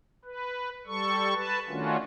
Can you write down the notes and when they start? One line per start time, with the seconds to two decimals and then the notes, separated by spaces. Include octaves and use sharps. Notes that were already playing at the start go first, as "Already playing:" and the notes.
0.25 B4
0.87 G3 A4 C#6
1.34 B4 A5
1.69 D#3 A3 C#4 D4 F4 F#4